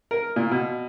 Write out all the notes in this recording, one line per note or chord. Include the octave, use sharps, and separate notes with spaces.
A#4
A#2
B2